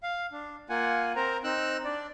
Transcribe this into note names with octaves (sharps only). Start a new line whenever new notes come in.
F5
D4
A#3 F4 F#5 G#5
C4 A#4 C5 A#5
C4 D#4 E6 F#6
D4 D5